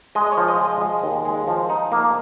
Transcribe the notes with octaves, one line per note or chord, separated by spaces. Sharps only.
G#3 D#5
D#5
C#5
F3
D#5
G#3
D#5
G#3
D#2
G#3
F3
D#4
A#3